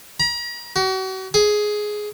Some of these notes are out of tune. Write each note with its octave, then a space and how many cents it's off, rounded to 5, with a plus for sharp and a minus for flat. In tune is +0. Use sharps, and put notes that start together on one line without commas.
A#5 +40
F#4 +40
G#4 +10